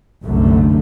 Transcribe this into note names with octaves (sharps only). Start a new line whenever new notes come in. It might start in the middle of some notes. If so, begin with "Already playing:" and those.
F#1 C2 F#2 D3 A3